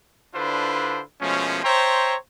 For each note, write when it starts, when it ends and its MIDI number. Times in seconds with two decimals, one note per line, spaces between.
0.34 1.01 50
0.34 1.01 62
0.34 1.01 64
0.34 1.01 65
0.34 1.01 71
0.34 1.01 72
1.21 1.60 47
1.21 1.60 53
1.21 1.60 56
1.21 1.60 57
1.21 1.60 61
1.64 2.15 72
1.64 2.15 73
1.64 2.15 76
1.64 2.15 79
1.64 2.15 82
1.64 2.15 84